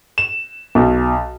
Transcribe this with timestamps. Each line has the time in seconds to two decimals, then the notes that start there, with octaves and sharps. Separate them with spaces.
0.18 E7
0.75 B1